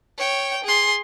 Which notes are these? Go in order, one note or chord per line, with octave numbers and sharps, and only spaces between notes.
C#5 G5
G#4 C6